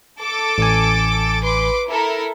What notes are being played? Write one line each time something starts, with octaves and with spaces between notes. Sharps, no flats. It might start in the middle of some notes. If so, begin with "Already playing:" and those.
A4 D6 A6
A1 G#5
B4 C6 D6
E4 A4 A#4